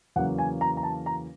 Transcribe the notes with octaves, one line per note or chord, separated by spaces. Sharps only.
E2 C#3 F#3 A#3 F#5
G#5
A#5
A#5
A5
A#5